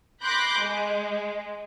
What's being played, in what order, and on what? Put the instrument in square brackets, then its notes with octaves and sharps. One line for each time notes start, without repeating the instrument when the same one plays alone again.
[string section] B5 C6 D6 F#6 G6 A#6
G#3